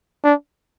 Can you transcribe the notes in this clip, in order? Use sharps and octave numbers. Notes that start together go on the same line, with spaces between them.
D4